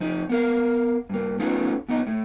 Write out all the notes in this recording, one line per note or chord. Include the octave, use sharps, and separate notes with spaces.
F2 D#4
B3 A#4 F5
G2 A#3
A3 B3 C#4 D#4 F4
A#2 B3 D#4 D#5
A2 A3